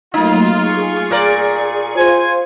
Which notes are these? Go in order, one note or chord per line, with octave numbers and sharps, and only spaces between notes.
F#3 A3 A#3 D#4 F4
G#4 C#6
A#2 A#4 D5
F4 C5 G#5